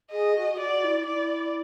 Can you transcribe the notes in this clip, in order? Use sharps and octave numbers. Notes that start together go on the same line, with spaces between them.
G#4 D#5
F#4
F#4 D5
E4
E4 D5